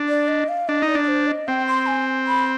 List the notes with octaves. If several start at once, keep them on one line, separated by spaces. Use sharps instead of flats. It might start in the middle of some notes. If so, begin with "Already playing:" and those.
Already playing: D4
D5
D#5
F5
D4 D#5
D#4
D5
D4
D5
C5
D#5
C4 G5
C6
G#5
B5